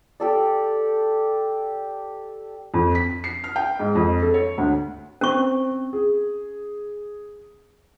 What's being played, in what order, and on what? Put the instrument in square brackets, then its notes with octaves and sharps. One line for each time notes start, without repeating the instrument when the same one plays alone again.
[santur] G4 A4 D5
[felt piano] F2
B6
C7
F6
G5
G#2
F2
A4
C#5
D2
[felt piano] C4 [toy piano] C#4 C#6
[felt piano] G#4